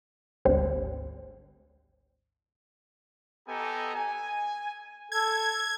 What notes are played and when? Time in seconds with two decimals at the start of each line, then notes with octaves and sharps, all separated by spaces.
0.45 G#1 D2 G3 C5
3.47 B3 G4 A4 D#5 G#5 A#5
3.95 G#5
5.12 A4 G#6